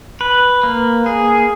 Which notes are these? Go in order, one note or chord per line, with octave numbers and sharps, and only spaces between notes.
B4
A#3
G#4